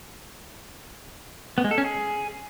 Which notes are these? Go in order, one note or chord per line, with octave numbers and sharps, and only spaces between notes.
B3
G#3
A4
C#4
G#4